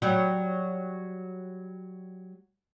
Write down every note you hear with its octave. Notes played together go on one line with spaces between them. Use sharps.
F#3 G3